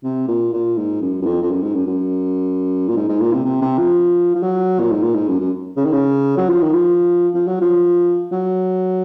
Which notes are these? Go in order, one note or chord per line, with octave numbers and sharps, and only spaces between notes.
C3
A#2
A#2
G#2
F#2
F#2
F2
F2
F#2
G#2
F#2
F#2
A#2
G#2
G#2
A#2
C3
C3
C3
F3
F3
F#3
A#2
G#2
A#2
G#2
F#2
F#2
C#3
D#3
C#3
F#3
F3
D#3
F3
F3
F#3
F3
F#3